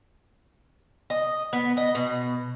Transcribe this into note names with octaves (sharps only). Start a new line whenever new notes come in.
D#5
B3
D#5
B2